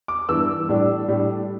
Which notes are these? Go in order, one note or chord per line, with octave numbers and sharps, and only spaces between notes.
D6
G2 E3 B3 E6
A2 G3 D4
A2 G3 D4